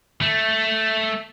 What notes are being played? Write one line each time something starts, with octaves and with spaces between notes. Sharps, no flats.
A3